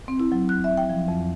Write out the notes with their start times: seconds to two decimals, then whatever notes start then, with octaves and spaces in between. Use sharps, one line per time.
0.08 C4
0.20 E4
0.32 F#3
0.49 F#6
0.64 E5
0.77 G5
0.89 F3
1.08 F2